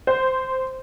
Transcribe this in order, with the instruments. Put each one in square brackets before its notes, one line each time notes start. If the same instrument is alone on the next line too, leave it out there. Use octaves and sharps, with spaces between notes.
[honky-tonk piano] C5